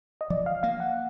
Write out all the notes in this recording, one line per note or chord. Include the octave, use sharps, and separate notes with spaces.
D#5
F3 D5
F5
A#3 F5
F#5